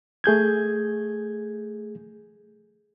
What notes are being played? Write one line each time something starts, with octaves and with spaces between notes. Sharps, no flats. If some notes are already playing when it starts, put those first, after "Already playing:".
A3 G#4 G6 G#6